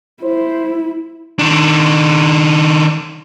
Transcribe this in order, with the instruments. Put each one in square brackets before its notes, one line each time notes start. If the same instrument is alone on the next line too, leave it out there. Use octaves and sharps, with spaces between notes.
[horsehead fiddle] E4 [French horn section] C5
[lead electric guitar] D#3 D4